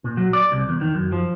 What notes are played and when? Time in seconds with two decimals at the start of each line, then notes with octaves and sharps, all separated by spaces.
0.04 A#2
0.17 F#3
0.33 D5
0.52 C2
0.69 E2
0.81 D#3
0.95 F#2
1.12 F3